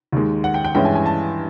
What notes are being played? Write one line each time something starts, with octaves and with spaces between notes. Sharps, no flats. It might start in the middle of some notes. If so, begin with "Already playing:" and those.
D#2 D#3 G#3
F#5
G5
G5
G2 E3 G#3 C#4 E4 G5
G#5
G#5
A5